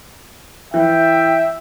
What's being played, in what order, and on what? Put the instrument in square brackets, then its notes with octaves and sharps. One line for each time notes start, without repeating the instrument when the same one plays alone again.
[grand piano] E3 [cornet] E5 [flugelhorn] G5